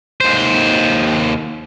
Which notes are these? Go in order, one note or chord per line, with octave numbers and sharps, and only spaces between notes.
D#2 C5